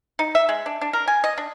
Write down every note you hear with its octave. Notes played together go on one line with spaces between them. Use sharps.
D#4
E5
G#3
D4
D4
A#4
G#5
D#5
D4